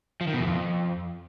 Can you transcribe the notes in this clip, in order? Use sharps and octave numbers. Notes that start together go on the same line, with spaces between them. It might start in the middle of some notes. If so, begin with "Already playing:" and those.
F3
D#3
B2
E2
F2